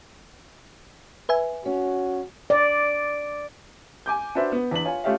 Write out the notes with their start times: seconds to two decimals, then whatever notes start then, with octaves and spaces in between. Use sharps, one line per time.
1.29 B4 E5 G#5
1.66 C#4 F#4
2.50 D5
4.06 G#5 D6 G6
4.35 D4 F#4 B4 C5 E5
4.52 B3
4.71 E2 D4 B6 F#7
4.85 F4 C#5 G#5
5.04 A3 C#4 F4 G4 E5 F5